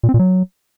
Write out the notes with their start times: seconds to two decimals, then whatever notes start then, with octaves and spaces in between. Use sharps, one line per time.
0.03 A#2
0.09 C4
0.14 A#2
0.19 F#3